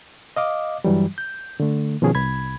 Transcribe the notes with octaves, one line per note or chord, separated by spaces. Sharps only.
D#5 F5 D6
G2 E3 F#3 G3
G6
D3 A3
B2 D#3 F3 C#4 G#4
C2 B5 G#6